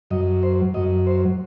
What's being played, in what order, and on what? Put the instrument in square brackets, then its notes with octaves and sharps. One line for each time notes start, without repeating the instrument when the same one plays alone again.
[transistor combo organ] F#2 F#3 D#5
C5
F#2 F#3 D#5
C5